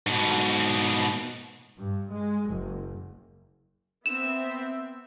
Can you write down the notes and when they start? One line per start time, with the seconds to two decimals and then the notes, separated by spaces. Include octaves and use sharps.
0.07 G#2 B2
1.78 G2
2.12 G#3
2.49 F#1
4.06 B3 C4 E5 E7